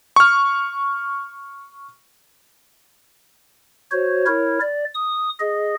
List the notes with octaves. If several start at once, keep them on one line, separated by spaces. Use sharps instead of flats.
C#6 F6
F#4 C5 C#5
E4 A#4 C#5
D5
D#6
G#4 D#5